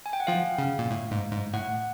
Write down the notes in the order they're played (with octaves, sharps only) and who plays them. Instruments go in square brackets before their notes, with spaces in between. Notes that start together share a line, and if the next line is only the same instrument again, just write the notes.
[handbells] G#5
G5
F#5
[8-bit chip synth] F3 [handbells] F5
[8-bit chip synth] C#3
A#2
A2
G#2
G#2
[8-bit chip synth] A2 [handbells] F#5